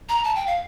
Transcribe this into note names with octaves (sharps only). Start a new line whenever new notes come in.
A#5
A5
G5
F5